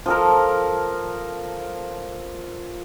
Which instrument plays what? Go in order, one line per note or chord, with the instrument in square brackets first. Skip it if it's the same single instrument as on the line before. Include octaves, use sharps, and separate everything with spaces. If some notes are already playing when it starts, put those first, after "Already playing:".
[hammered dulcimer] F3 A4 A#4